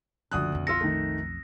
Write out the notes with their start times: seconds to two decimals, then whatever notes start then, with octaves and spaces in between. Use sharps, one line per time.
0.31 F#1 D2 F3 D#6 F#6
0.52 B1 F2
0.67 F4 E6 A#6 C#7
0.81 D#3 A3